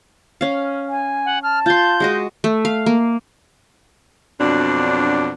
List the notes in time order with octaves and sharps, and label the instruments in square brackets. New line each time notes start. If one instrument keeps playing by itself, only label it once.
[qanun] C#4 F5
[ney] G#5
[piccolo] F#5
[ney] A5 [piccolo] F6
[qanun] F4 C6 [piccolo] G6
[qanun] G#3 F#4 D#5
A3
F5
A#3
[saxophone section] F2 B2 F#3 D4